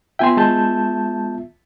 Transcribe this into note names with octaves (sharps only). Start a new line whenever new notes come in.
B3 F4 E5 G5 G#5 C6
G#3 A5 G6